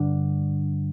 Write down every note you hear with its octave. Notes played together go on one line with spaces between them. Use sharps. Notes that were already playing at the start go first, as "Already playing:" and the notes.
Already playing: G2 D3 D4